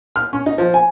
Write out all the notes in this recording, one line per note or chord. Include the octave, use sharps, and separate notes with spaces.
F6
C#4
D#4
F3
G#5